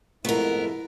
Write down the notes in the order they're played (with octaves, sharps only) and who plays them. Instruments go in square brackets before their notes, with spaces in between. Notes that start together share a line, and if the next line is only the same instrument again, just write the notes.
[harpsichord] F2 G#2 A3 [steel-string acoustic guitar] B3 A#4 [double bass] E4